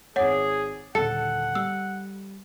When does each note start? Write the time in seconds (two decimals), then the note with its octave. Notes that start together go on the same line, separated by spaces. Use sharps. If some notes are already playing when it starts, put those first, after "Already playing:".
0.16 G#1 G#4 C#5 F#5 D6 A6
0.95 D#1 D3 A4 F#5 C#7
1.55 G3 E6